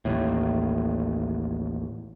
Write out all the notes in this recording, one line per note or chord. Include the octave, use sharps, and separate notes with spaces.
A1 D#2 A2